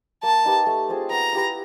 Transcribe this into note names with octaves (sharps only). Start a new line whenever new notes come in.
A#3 A5
D#4 G4 B4
A3
C4 F4 G#4
B3 A#5
E4 G4 B4